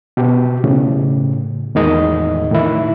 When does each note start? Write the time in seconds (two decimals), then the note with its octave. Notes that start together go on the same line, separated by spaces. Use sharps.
0.17 B2 G4
0.64 A2 C#3
1.75 E2 A2 D#3 G#3 D#5
2.51 A2 D#3 E4